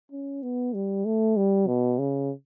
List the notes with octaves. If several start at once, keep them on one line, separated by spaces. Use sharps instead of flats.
C#4
B3
G3
A3
G3
B2
C#3